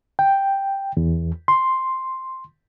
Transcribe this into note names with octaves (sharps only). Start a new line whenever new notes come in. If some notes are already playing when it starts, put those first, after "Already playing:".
G5
E2
C6